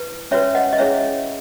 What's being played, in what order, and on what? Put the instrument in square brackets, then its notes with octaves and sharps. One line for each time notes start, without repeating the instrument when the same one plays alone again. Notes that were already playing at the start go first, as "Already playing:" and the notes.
Already playing: [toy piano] E4 B4
C#4 F#4 B4 C#5 E5
D#5 F#5
D#5
C#4 E4 G#4 C#5 E5